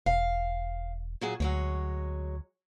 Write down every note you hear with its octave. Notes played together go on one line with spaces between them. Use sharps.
E1 F5
A#2 F#3 G#4
D2 F#3 G#3 C#5